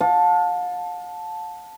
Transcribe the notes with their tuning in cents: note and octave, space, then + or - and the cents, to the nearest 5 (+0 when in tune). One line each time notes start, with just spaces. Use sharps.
F5 +40 A5 +0